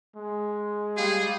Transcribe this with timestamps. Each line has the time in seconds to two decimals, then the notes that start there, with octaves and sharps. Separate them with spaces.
0.16 G#3
0.97 G3 G#4 F5